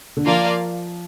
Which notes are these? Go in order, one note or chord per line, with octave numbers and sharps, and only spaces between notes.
D3
F3 A#3 F4 D5 F5